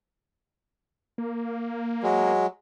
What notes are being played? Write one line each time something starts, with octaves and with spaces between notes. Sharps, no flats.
A#3
F#3 G#3